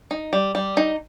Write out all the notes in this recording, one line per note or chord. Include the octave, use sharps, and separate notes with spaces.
D#4
G3
G3
D#4